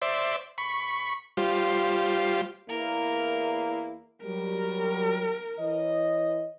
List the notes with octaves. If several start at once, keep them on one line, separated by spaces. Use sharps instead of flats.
C5 D5 E5
B5 C#6
G3 F4 C5
E2 A#3 E4 A#4
F#3 G3 A#4
E3 C#5 D#5